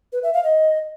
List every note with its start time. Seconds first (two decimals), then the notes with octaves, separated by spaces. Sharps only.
0.13 B4
0.23 E5
0.34 F5
0.44 D#5